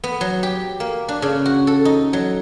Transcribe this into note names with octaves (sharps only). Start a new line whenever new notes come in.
B3
F#3
G4
A#3
D4
C#3
F#4
A4
D#4
F#3